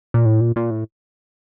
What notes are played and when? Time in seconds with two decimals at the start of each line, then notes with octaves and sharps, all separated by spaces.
0.14 A#2
0.26 A2
0.41 A#2
0.56 A#2
0.71 A2